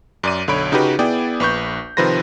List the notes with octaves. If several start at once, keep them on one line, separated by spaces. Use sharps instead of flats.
F#2 D5 D#7
B1 D3 C#5 B5 D7
C#3 D#4 F#4 G4 B4
B3 E4 G#4 D5 G5
A#1 B4 C#6 G6
C3 D#3 F3 B4 C5 A#6